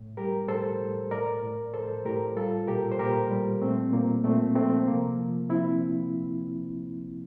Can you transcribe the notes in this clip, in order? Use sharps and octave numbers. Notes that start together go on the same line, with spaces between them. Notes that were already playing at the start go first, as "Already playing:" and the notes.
Already playing: A2
G3 G4 A#4
A2 A4 C5
A2
A2 A#4 D5
A2
A2 A4 C5
A2 G4 A#4
G3 F4 A4
A#2 G4 A#4
C5
A#2 G4 A#4
G3
A#2 A3 C4
A#2 A#3
A#2 A3 C4
F3 A3 C4
C3 A#3
F3
F3 C4 E4